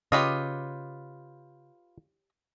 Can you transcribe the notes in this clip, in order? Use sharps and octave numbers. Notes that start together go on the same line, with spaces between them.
C#3 F4 G4 B4 C#5 D#5